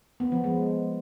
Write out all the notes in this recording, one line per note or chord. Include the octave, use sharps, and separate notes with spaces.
B3
F3
G#3